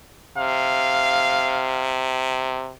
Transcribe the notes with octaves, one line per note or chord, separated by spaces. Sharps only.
C3 F5